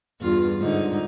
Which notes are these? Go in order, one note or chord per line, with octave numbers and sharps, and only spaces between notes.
E2 G2 F4
G#2 D3 D#4